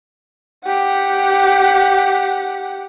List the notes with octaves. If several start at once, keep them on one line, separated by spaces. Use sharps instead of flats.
G4 F#5